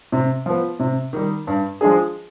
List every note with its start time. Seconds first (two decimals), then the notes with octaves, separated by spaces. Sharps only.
0.12 C3
0.46 F3 B3
0.80 C3
1.13 D#3 G3
1.47 G2
1.81 F3 G#3 D4 G#4